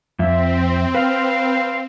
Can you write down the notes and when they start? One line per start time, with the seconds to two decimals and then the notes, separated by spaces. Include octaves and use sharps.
0.19 F2 C4 E5
0.95 B4 F5